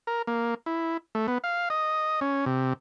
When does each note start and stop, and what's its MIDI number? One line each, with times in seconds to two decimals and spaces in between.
0.07 0.22 70
0.27 0.54 58
0.66 0.97 64
1.15 1.27 57
1.28 1.38 59
1.44 1.69 77
1.70 2.20 75
2.21 2.45 61
2.46 2.73 48